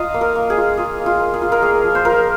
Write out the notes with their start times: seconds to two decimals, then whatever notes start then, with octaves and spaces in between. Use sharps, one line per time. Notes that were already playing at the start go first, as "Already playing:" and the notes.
Already playing: F4 D#5 F5 A#5
0.14 A#3
0.21 A#4
0.35 A#3
0.50 G#4
0.57 F4
0.77 F4 G#4
1.00 A#3
1.06 F4
1.20 A#3
1.34 G#4
1.42 F4
1.52 A#4
1.62 A#3 G#4
1.84 F3
1.95 C5
2.05 F4 A#4